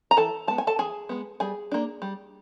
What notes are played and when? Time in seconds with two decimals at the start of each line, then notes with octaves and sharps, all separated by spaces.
0.11 A#5
0.17 E3 A4 A5
0.47 G#3 B3 A5
0.58 G#5
0.67 A4 A5
0.78 E3 G#4 G#5
1.09 G#3 B3
1.40 G3 G#4 G#5
1.72 A#3 D4
2.02 G3